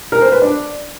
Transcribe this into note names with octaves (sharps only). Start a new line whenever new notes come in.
A#4
C5
B4
D4